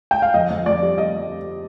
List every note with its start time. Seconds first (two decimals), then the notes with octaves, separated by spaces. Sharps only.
0.11 G5
0.22 F5
0.34 F2 D#5
0.50 F2
0.66 F2 D5
0.82 G3
0.98 G3 D#5